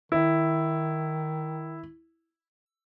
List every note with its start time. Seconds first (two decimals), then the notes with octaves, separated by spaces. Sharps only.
0.12 D#3 E4